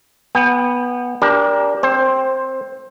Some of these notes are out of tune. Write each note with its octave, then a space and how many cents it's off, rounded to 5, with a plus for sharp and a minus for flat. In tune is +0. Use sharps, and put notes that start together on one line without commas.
B3 -10 G5 +30
D4 -15 G4 +20 A#4 +20
C4 +5 C5 +15